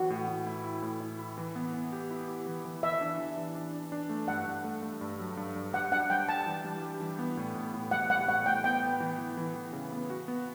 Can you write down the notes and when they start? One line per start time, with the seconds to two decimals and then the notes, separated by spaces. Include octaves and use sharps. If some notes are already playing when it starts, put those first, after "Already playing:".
Already playing: E3 F#4
0.10 A2
0.28 A2
0.47 E4
0.64 E4
0.82 A2
1.00 E4
1.19 E4
1.38 E3
1.56 B3
1.74 B3
1.92 G4
2.11 E4
2.28 G4
2.46 E3
2.65 E3
2.83 E3 E5
3.01 D4
3.19 E3
3.37 E3
3.55 D4
3.73 D4
3.92 D4
4.09 A3
4.28 G2 F#5
4.46 G2
4.64 A3
4.82 A3
5.01 G2
5.19 F#3
5.37 G2
5.56 G2
5.73 G3 F#5
5.92 D4 F#5
6.10 G3 G5
6.28 G3 A5
6.46 E3
6.65 G3
6.83 G4
7.00 E3
7.19 B3
7.37 A2
7.55 A2
7.74 A2
7.91 G3 F#5
8.10 G3 F#5
8.28 A2 F#5
8.46 A2 G5
8.64 B3 G5
8.83 B3
9.00 E3
9.18 E3
9.37 E3
9.55 E3
9.73 C#3
9.92 B3
10.10 F#4
10.28 B3